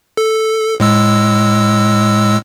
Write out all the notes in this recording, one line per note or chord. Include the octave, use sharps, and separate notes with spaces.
A4
A2 G#3 E6